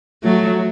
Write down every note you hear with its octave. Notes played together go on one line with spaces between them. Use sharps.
F#3 A3